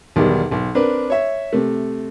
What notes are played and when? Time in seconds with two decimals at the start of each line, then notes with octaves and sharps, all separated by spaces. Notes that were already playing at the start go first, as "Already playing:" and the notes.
0.16 B1 E2 D#3 G3
0.51 B1
0.75 C4 D4 A#4 B4
1.10 C#5 E5
1.53 C3 A3